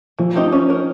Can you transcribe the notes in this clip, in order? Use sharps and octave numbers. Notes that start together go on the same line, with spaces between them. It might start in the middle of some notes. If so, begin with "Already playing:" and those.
E3 F3
A3 C4 D#4 G4
C#4
F#4 A#4 C#5